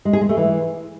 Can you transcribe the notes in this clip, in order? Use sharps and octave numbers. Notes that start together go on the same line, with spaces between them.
G#3
G#4
G#3
A3
E3